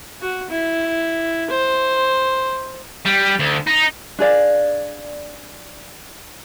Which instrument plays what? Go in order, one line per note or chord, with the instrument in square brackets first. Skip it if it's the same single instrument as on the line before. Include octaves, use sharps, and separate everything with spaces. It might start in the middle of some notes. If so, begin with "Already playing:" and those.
[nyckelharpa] F#4
E4
C5
[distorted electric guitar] G3
D2
D#4
[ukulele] D4 G#4 D5 F5